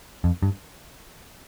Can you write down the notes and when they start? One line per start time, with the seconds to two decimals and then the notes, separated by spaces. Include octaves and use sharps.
0.24 F2
0.43 G2